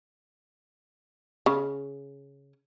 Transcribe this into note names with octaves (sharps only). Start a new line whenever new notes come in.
C#3